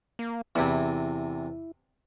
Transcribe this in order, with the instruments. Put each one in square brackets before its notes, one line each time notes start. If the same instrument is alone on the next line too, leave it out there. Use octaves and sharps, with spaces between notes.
[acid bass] A#3
[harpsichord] E2 C3 [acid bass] E4